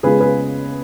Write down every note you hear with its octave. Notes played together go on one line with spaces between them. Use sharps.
C#3 G#3 B3 F4 G#4 B4
G#4 B4